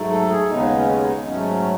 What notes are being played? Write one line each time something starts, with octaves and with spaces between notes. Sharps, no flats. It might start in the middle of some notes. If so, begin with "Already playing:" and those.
Already playing: G#2 F#3 A3
A4
G#4
D#2 C#3 G#3 B3 D#4
C#4
D#4
G#2 F#3 A3 C#4